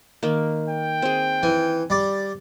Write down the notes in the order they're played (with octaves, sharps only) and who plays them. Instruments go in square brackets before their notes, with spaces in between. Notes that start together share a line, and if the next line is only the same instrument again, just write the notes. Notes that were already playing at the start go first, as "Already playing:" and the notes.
[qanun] D#3 A#3
[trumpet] G5
[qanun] C4 G#4
[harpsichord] E3 [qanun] G#5
[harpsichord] G3 D5